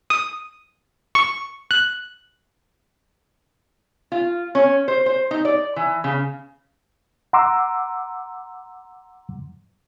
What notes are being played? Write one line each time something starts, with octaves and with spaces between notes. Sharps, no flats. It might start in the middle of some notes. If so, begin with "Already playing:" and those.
D#6
C#6
F#6
F4
C#4
C5
C5
D#4
D5
E3
C#3
F#5 A#5 C6 D6 E6